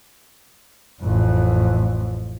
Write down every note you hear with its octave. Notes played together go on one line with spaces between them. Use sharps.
A1 F2